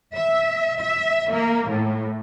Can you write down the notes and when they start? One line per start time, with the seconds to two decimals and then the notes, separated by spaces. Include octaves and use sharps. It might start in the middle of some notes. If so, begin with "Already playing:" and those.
0.16 E5
0.80 E5
1.32 A#3
1.69 A2